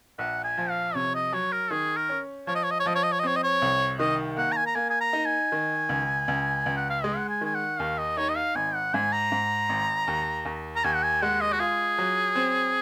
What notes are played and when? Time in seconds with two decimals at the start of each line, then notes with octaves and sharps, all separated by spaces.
0.19 A#1 F#5
0.44 G#5
0.58 F3
0.70 F5
0.95 C3 C#5
1.14 D#5
1.33 F#3 C#5
1.52 A#4
1.71 D#3 G#4
1.96 A#4
2.09 C#4
2.47 F3 C#5
2.55 D#5
2.64 C#5
2.71 D#5
2.80 C#5
2.86 F3 D#5
2.95 C#5
3.03 D#5
3.12 C#5
3.19 D#5
3.23 C4 C#5
3.36 D#5
3.43 C#5
3.62 C2
3.99 D#3 D#5
4.37 A#3 F#5
4.52 A#5
4.57 G#5
4.66 A#5
4.75 A#3 G#5
4.90 G#5
5.01 A#5
5.13 D#4
5.26 G#5
5.52 D#3
5.89 C#2
6.28 C#2
6.66 C#2
6.77 F#5
6.90 F5
7.04 G#3 D#5
7.17 F#5
7.29 G#5
7.41 D#3 G#5
7.54 F#5
7.79 D#2 F5
7.98 D#5
8.17 D#4 C#5
8.29 D#5
8.36 F5
8.55 G#1 G#5
8.74 F#5
8.94 G#2 G#5
9.13 A#5
9.32 G#2
9.69 G#1
10.07 D#2
10.45 D#2
10.76 A#5
10.84 D#2 G#5
10.95 F#5
11.03 G#5
11.22 G#3 F#5
11.41 D#5
11.53 F#4
11.60 F4 G#4
11.98 F#3
12.35 C4